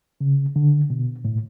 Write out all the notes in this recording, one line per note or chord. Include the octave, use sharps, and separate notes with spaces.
C#3
D3
B2
A2